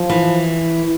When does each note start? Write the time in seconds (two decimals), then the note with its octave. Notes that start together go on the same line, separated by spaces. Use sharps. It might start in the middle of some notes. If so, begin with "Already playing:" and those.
Already playing: F3
0.10 E3